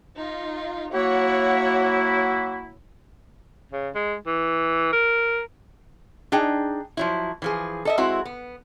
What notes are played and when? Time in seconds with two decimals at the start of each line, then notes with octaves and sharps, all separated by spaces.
0.17 D#4 F4
0.94 F#3 A#3 E4 F#4 C#5 F#5
3.72 C#3
3.95 G#3
4.26 E3
4.92 A#4
6.32 D4 D#4 G#4 G5
6.97 F3 F#3 E4
7.42 E3 F3 G#4
7.85 A4 D#5 E5
7.98 G#3 C4 E4 F#4
8.25 B3